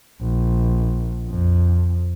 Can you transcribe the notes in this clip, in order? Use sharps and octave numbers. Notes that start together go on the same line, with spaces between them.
A#1
F2